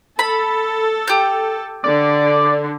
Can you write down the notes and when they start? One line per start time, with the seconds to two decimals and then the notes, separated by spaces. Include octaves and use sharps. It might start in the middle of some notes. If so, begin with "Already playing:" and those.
0.19 A4 B5
1.08 G4 G6
1.84 D3 D5